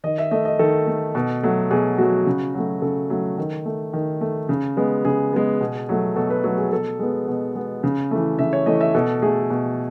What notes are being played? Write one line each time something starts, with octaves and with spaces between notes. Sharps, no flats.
D#3 D#5
E5
A3 D#5
D#5
D#3 A4
A3
B2
F#3 A3
B2 G#4
F#3 A3 F#4
C#3
F#3 A3
C#3 A4
F#3 A3
D#3
A3
D#3
A3
C#3
G#3 B3
C#3 G#4
G#3 B3
B2
F#3 A3
B2 A4
B4
F#3 A3 A4
G#4
B2 A4
G#3 B3
B2
G#3 B3
C#3
E3 A3
C#3 E5
C#5
E3 A3 D#5
E5
B2 A4
A3 G#4
B2